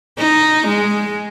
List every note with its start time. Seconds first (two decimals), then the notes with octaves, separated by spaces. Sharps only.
0.18 D#4
0.67 G#3